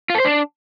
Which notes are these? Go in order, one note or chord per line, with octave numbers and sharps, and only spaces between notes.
F4
A4
C5
D4